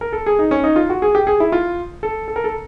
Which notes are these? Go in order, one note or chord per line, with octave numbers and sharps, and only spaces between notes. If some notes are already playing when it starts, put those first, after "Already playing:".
A#4
A4
G#4
D#4
C#4
D#4
F4
F#4
G#4
G4
G#4
E4
F4
A4
A4
A#4
A4